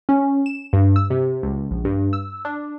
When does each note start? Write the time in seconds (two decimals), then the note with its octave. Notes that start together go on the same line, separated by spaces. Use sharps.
0.09 C#4
0.46 E7
0.73 G2
0.96 E6
1.10 C3
1.43 C#2
1.71 A#1
1.85 G2
2.13 E6
2.45 D4